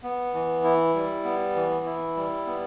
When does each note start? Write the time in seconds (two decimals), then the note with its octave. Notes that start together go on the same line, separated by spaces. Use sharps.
0.03 B3
0.34 E3
0.64 E4
0.95 G3
1.24 B3
1.55 E3
1.85 E4
2.17 G3
2.47 B3